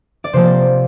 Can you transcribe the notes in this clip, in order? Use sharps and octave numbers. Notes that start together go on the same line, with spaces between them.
D5
C3 F3 A#3 C5